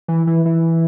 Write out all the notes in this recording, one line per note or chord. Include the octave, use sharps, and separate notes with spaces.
E3
E3
E3